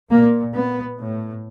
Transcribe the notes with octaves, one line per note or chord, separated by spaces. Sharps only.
A#2 A#3
B3
A2